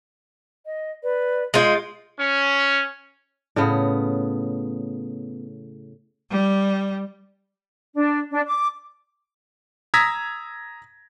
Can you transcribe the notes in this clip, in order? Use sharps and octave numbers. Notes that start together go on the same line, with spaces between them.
D#5
B4 D5
G#3 F4 G6
C#4
A2 C#3 B3
G3
D4
D4
D6
A#5 D#6 E6 G#6 A#6 B6